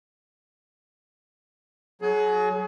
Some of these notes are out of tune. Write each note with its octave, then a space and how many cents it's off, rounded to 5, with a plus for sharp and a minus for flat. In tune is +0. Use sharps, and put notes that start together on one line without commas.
F#3 +0 G#4 +35